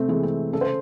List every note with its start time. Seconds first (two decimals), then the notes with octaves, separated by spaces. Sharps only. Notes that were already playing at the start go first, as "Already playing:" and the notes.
Already playing: C3 A3 C4
0.08 E3 G#3
0.23 C4
0.52 C#3 A4
0.61 C5